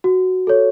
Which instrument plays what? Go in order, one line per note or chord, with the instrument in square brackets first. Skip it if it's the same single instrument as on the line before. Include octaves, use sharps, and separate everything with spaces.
[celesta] F#4
A4 C#5